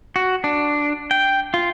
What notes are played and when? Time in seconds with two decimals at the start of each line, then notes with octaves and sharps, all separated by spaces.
0.16 F#4
0.44 D4
1.11 G5
1.54 F4